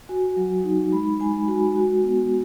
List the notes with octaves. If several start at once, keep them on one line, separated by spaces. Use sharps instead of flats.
F#4 G#5
F#3
D#4
G#3 B5
G#3 G#5
F#4 G#5
F#4
B3